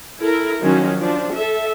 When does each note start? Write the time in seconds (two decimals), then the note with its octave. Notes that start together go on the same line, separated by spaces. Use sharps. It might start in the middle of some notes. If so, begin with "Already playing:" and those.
0.19 E4 A4 A#4
0.61 D#3 F3 F#3 C#4
0.96 F3 D4
1.35 A4 E5